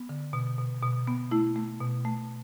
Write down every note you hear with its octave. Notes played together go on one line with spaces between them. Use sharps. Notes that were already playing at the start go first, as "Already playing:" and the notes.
Already playing: B3
D3
B2
B2
B2
B3
A3 E4
A3
B2
A3